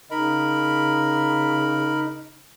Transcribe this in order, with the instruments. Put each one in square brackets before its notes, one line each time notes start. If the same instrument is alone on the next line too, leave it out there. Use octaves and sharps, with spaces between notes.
[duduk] C#3 [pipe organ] D#4 [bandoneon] A#4 B5